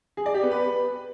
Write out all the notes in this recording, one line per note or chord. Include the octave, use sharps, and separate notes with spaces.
G#4
D5
G4
B3
B4